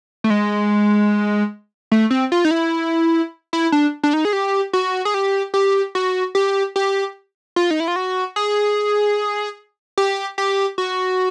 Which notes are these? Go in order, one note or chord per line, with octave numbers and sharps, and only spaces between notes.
A3
G#3
A3
C4
F4
D#4
E4
E4
D4
D4
D#4
G#4
G4
F#4
G#4
G4
G4
F#4
G4
G4
F4
D#4
E4
F4
F#4
G#4
G4
G4
F#4